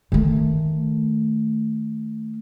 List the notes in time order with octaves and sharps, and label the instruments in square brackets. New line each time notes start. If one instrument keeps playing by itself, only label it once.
[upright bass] D#3 A3